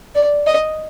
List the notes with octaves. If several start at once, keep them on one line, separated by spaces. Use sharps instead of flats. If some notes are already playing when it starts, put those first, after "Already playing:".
D5
D#5